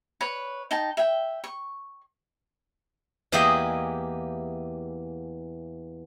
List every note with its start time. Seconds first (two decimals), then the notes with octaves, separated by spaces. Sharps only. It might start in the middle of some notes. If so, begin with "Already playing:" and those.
0.21 B4 C#5
0.71 D#4 G5 A5
0.97 E5 G5
1.44 C#6
3.32 E2 E3 A#3 G4 G#4 D#5